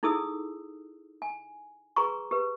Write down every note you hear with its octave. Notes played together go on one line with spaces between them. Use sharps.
D#4 E4 G#4 A4 D#6 E6
G#5
G#4 B4 A#5 C6 C#6
G4 B4